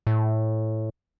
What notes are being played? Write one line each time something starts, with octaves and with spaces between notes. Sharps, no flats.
A2